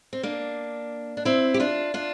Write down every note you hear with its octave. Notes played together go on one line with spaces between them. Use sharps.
C4
A#3 D4
D4
C4 E4
G4
D4 F4
D4 F4